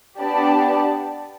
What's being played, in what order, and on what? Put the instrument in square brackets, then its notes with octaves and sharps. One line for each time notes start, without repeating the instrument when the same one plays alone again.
[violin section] B3 D4 G4 D5 A5